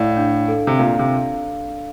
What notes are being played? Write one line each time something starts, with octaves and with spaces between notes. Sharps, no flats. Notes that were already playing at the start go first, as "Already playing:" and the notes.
Already playing: A2 D5 F5
D4
A4
C3
A#2 F5
C3